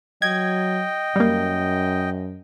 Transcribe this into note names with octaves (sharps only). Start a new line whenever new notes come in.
F#3 D#5 G5 G#6
F#2 G3 A#3